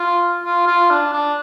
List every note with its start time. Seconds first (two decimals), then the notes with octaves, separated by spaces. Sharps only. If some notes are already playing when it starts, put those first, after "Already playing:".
Already playing: F4
0.44 F4
0.67 F4
0.90 D4
1.13 D4